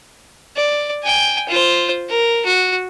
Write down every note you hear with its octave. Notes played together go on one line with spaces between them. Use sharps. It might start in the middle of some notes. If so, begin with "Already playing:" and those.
D5
G5 G#5
F4 C5
A#4
F#4